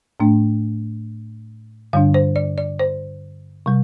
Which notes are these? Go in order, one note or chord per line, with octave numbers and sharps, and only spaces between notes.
A2 A3 D4
G2 D3 G3 D4 F5
C5
D5
D5
C5
C3 G3